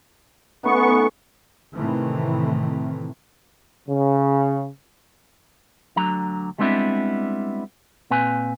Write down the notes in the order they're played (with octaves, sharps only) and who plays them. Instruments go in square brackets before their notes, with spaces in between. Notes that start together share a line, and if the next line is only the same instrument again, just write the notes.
[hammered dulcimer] A3 C#4 D#4 [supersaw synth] B3 C#6
[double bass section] A2 C3 D#3 E3 A3 C4
[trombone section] C#3
[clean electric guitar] D2 D3 F#3 A#5
G3 G#3 B3 C4 D4 E4
A#2 C4 B4 G#5